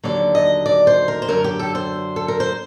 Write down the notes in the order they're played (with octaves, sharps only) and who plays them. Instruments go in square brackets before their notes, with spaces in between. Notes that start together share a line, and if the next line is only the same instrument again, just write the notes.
[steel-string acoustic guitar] D#2 D3 F#3 D5
D#5
D5
C5
A#4
C5
F#2 D3 F#3 A#4
G4
A4
C5
A4
A#4
C5